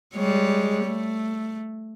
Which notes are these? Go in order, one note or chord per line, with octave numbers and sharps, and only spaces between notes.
G3 G#3 C#5
A3